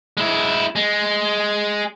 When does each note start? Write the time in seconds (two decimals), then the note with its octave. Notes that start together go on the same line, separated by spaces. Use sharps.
0.17 G#3 E4
0.76 G#3